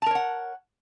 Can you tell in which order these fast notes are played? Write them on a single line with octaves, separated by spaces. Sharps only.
A5 A#4 C#5 F#5